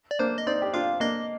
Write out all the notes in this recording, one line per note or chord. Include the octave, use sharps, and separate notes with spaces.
D5
A#3 D4 C5
D#5
C4 D#4 D5
G4
D4 F4 F5
A#3 D4 D#5